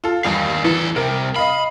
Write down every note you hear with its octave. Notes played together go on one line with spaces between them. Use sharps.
F4 A4
E2 G2 D#3 F5
E2 E3 A4
C2 C3 A#4
D#5 F5 B5